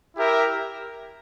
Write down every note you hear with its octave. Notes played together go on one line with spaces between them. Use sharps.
E4 G4 A#4 E5